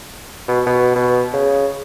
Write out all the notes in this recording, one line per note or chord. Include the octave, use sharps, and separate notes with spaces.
B2
B2
B2
C#3